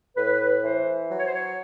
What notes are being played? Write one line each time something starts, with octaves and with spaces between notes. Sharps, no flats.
A2 B4
E3 C5
F#3
C#5
C5
C#5